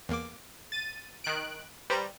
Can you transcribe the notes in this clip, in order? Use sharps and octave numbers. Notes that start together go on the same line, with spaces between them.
E2 A#3 D6
A6 D#7
D#3 F#6 D7
G3 B4 C5 A#5